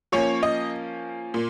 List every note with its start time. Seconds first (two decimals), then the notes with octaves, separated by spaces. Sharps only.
0.12 F3 A#3 C#4 C#5
0.43 D#5
1.34 A#2